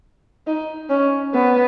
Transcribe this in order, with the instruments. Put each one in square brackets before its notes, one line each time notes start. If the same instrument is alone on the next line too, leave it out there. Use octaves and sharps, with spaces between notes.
[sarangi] D#4
C#4
B3